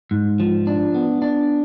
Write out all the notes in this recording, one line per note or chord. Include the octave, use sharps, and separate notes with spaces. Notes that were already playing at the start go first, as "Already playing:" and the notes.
G#2
F3
D4
B3
D4